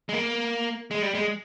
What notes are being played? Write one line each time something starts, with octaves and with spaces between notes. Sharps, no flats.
G#3
A#3
G#3
G3
G#3